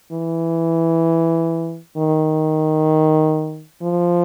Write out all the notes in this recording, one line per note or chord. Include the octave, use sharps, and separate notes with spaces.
E3
D#3
F3